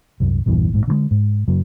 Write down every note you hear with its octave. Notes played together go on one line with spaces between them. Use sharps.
C2 F#2
A#1 E2 G2 E3
A#1 G#2
D3 E3 G#3
G#2
F#2 C#3 F#3